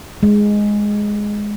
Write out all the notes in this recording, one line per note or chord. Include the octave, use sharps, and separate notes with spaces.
G#3